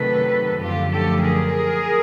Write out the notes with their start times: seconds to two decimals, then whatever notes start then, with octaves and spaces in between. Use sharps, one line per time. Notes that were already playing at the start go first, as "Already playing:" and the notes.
Already playing: C3 D#3 F#3 A3 A4 B4
0.61 F#2 D3 F3 A3 F4 G4
0.90 G4 A4
1.20 G#4 A#4